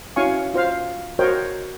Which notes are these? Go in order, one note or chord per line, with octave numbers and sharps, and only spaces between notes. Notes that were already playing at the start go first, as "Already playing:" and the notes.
C#4 E4 F#4 F5 G#5 C#6
F4 C5 F5
F#4 A#4 C5 C#5 D#5 G5